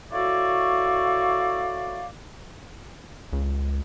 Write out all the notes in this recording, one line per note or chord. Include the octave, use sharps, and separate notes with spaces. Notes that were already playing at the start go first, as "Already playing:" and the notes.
E4 F#4 A4 C#5 D5 F5
C#2